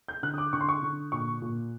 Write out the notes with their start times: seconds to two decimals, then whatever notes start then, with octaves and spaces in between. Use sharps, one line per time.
0.08 G6
0.23 D3 F#6
0.34 D#6
0.38 D6
0.53 D3 C#6
0.61 C6
0.69 C#6
0.82 D3
1.12 A#2 C#6
1.42 A#2